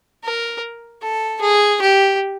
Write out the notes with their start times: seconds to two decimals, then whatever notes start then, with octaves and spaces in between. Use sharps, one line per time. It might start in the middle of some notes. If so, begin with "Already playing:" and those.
0.24 A#4
1.02 A4
1.41 G#4
1.81 G4